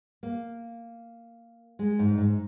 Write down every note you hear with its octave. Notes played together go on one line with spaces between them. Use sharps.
A#3
G#3
G#2
G#2